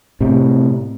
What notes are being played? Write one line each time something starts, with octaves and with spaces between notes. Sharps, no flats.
A2 C3